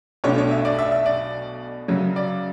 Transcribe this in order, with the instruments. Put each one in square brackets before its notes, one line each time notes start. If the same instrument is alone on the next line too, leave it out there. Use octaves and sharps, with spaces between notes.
[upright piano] B1 B2 A3 D4 C#5
C#5
E5
D5
E5
E5
D5
F#2 C#3 F#3
D5